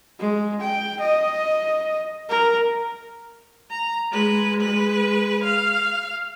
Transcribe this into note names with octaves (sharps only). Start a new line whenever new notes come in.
G#3
G5
D#5
A#4
A#5
G#3 B4
G#3 B4
F5